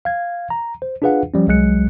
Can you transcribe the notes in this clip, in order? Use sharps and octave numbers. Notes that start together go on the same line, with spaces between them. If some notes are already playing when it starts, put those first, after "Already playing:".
F5 G#6
A#5
C5
D4 F4 G#4 B4 F5 F#5
F3 G3 C#4
C2 F#3 G#3 F#6 C#7